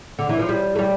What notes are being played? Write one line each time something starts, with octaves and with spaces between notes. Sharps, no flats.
D3
E3
F3
G3
A3
G3